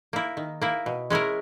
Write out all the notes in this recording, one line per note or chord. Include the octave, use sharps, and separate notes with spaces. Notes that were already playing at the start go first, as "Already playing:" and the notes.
A#3 E4
D#3
A#3 E4
B2
G#3 C#4 E4 A#4